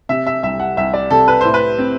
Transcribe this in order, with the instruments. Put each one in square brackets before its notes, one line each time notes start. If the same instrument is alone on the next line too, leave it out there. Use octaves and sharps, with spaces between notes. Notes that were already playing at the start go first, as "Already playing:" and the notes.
[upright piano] C3 E5
E5
C2 E5
F#5
C2 E5
D5
C3 A4
B4
A2 C5
B4
C4